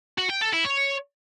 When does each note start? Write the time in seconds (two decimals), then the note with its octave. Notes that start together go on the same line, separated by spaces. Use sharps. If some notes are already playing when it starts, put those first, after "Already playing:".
0.18 F#4
0.30 G5
0.41 A4
0.53 E4
0.64 C#5